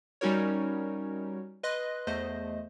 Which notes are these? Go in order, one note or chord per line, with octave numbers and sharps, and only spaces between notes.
G3 C#4 D#4 F#4 A#4 C#5
B4 D#5 C6 F#6
E2 A3 C5 D#5